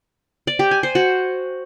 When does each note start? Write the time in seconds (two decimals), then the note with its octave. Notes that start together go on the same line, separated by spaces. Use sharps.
0.47 D5
0.59 G4
0.71 G#5
0.83 C5
0.95 F#4